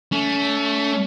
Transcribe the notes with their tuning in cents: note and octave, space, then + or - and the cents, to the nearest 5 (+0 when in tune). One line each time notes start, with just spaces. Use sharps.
A3 +0 C#4 +35